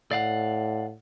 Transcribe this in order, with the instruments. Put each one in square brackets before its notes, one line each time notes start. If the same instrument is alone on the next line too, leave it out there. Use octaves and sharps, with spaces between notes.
[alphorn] A2 [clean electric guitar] D5 F5 F#5